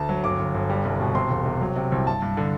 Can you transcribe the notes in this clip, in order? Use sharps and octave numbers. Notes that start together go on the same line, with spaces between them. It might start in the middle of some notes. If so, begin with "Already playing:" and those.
Already playing: D2 A5
F#3
G1 D6
G1
G1
G3
C2
B2
C3 C6
E1
C3
F#3
C3
C2
G2 A5
G2
D3